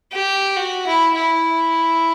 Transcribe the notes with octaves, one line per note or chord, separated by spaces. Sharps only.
G4
F#4
E4
E4